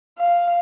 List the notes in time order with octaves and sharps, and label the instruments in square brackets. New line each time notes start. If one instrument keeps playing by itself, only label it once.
[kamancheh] F5